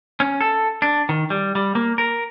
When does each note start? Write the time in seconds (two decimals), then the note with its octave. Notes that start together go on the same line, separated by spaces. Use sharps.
0.20 C#4
0.41 A4
0.82 D4
1.09 D#3
1.30 G3
1.55 G3
1.75 A#3
1.98 A#4